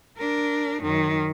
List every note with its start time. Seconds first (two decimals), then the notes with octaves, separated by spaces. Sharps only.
0.17 D4 A#4
0.83 F#2 D#3